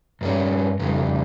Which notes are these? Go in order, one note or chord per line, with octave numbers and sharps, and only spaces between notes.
G2 G3 C#4
F2 C#3 G3